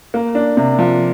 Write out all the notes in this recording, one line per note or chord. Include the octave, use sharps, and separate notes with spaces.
A#3
D4
C3
F3